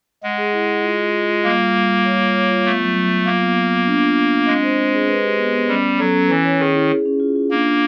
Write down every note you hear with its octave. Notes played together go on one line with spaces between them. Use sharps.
G#3 F#5
G#4
E4
G#4
F4
F4
F4
F4
G3 A#3
G3
G3
G3
C#5
F4
C#5
F4
A3 B3
F#3
F#3
F#3
A#3 F4
B3
F4
B3
D4
F4
F4
D4
G#3 C4
C5
C5
G#4
B4
G4
B3
B3
G3 C#4
C#4
F#3 A4
C#4
E3 E4
C#5
D#3 G#4
E4
G#4
C#4
F4
F4
A#3 D4
D4